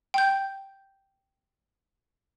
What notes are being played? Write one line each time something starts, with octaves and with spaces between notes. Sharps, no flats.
G5 G6